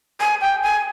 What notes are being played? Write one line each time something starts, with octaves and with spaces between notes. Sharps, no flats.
G#5
G5
G#5